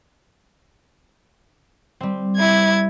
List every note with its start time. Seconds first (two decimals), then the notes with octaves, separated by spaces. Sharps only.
2.00 G3 C4
2.37 E4 G#6